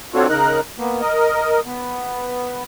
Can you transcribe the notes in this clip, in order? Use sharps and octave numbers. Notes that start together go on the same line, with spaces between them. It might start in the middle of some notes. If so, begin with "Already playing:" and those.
C4 D4 F4 F#4 A4 C#5
C#3 D#4 A#4 A#5 F#6
A#3 B3
A#4 D#5
B3